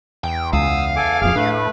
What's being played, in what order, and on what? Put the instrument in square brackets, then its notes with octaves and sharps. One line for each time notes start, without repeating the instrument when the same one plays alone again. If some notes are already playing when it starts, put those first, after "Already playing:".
[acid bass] E2 [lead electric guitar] G5
[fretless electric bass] C#2 [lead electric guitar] F5 [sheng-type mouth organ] D#6 E6
[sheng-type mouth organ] A4 G#5 D6
[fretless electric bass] D#1 F2 [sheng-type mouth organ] G#4 D6 F6
[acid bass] A2 [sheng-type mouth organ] A3 B4 [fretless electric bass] D4